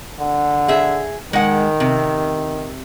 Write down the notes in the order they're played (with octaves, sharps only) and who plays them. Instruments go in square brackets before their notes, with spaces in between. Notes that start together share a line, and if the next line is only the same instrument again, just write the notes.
[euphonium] D3
[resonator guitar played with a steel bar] G#4 E5
[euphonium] D#3 [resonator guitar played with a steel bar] G#3 F#5
[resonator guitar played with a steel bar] C3